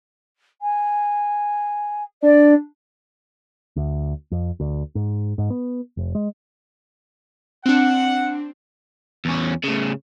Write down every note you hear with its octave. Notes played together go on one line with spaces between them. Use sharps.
G#5
D4 D5
D2
F2
D2
G#2
G#2
B3
F1
G#3
C4 D4 F#5
E2 C#4
A2 C#3